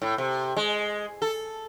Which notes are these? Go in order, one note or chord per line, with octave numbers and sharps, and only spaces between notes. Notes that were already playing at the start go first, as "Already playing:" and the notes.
A2
C3
G#3
A4